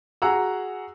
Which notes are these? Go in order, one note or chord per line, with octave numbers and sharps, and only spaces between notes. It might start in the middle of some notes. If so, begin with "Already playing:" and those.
F#4 G#4 F#5 A#5 E6